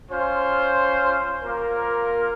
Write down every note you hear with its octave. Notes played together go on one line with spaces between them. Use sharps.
C#4 F4 C5
A#3 F4 A#4